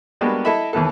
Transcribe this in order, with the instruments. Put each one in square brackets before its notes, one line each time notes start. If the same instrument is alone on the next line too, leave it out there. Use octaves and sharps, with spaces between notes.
[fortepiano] G3 G#3 A#3 B3 D4 F#4
E4 A4 D#5 E5 B5
D#2 E3 B3 A4